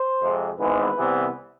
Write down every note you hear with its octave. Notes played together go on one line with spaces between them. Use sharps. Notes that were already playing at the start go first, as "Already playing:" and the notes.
Already playing: C5
F2 C3 G#3
G#1 G#2 E3 G#3 B3 B4
C2 C3 E3 B3